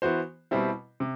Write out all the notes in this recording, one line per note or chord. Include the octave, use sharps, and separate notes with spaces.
E3 B3 F#4 C5
B2 G3 C4 E4
C3